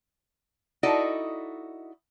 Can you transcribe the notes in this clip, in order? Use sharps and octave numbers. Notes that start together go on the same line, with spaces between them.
D#4 E4 F#4 A4 D5 D#5